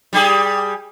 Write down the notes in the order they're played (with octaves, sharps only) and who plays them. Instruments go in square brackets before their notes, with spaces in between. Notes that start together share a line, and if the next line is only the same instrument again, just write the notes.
[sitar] G3 G4 G#4